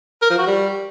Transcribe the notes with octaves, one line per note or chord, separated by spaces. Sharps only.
A#4
F3
F#4
G3